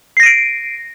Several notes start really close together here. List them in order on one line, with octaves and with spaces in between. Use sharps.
C7 A#6 D#7 D7